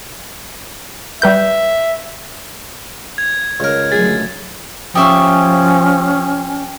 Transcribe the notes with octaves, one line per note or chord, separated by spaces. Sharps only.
G3 B4 E5 G6
G#6
C#2 A#4
D3 F#3 A3 G#4 A6
F3 C#4 G4 E5 F5 C#6 D#6